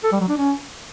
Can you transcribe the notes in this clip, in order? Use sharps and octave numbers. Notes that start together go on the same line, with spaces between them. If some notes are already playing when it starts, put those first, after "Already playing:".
A4
G3
F#3
D4
C#4